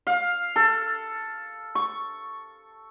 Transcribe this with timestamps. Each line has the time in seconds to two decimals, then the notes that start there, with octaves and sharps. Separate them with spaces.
0.07 F5
0.56 A4
1.75 C#6